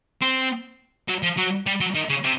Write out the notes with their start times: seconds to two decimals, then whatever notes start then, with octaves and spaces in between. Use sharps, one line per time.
0.21 C4
1.08 F#3
1.23 F3
1.37 F#3
1.66 G3
1.80 F#3
1.95 D#3
2.10 C#3
2.24 C3